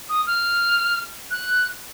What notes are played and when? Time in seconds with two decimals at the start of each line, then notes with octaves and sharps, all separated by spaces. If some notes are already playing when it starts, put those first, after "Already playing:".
0.09 D#6
0.27 F6
1.31 F#6